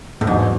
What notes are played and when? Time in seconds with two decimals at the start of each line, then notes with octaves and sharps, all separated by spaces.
0.21 A2
0.27 E2 G#2 B2 F#3 B3 D4